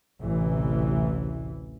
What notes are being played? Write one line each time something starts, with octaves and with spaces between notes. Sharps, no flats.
A1 D2 C3 E3